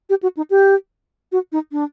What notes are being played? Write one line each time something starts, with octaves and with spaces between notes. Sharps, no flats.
G4
F#4
D#4
G4
F#4
D#4
D4